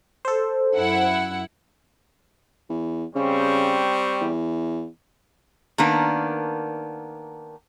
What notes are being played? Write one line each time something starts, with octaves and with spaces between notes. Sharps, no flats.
A4 C5
F#2 E4 F#5
E2
C#3 G3 C4 C#6
E2
D#3 A#3 B3 D4